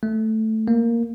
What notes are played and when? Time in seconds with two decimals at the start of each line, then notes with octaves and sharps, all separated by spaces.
0.03 A3
0.68 A#3